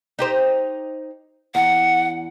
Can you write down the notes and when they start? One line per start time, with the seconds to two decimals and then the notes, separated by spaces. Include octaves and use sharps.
0.19 D#4 G4 C5
1.55 E2 F#5